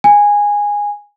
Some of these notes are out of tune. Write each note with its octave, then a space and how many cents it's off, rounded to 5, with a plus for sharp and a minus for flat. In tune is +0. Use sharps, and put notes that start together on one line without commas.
G#5 -10